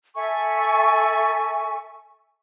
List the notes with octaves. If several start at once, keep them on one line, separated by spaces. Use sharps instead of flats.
A4 E5 G#5 C#6